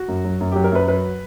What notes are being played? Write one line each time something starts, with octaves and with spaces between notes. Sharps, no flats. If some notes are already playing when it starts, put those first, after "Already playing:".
Already playing: F#4
F#2
F#3
F#2
F#3 G4
A#4
F#2 B4
F#3 B4